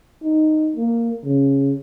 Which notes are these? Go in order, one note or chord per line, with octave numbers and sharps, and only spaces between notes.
D#4
A#3
C#3